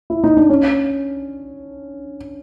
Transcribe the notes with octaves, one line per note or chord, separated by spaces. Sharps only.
E4
D#4
D4
C#4